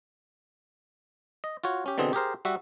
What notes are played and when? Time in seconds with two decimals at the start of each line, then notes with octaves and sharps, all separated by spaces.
1.44 D#5
1.64 F4 F#4 C#5
1.86 C#4 G4
1.98 B2 D3 E3 C4 G#4
2.13 G4 G#4 A#4 C5
2.45 G3 F#4 E5